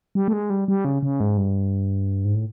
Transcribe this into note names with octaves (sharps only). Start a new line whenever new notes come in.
G3
A3
G#3
G3
G3
C#3
C#3
G#2
G2
G#2
A2